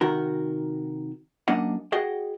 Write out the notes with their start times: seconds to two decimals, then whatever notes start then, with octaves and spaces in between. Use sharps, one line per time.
0.01 C3 D#3 F#4 A#4
1.48 F#2 A#3 D4 D#5 F#5
1.92 F#4 G#4 D#5 F#5 G5